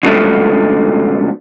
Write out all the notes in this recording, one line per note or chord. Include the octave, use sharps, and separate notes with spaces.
C#2 G2 B2 D3 F3 A3